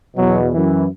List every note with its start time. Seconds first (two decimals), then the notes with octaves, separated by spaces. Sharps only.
0.16 E2 B2 F#3
0.51 F#2 E3